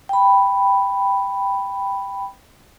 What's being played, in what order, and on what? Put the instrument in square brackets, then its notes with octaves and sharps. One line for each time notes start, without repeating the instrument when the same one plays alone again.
[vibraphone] G5 B5